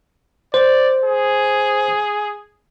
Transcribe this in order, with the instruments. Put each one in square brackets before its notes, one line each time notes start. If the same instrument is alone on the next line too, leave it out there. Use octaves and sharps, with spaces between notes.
[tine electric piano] C5 [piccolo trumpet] D5
[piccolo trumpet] G#4